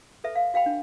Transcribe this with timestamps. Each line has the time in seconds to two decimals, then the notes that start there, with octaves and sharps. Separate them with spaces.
0.24 A4 B4 E5
0.35 F5
0.54 F#4 F5 G5 B5
0.66 D4